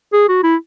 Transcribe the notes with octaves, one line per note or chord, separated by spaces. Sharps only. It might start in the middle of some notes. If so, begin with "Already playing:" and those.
G#4
F#4
E4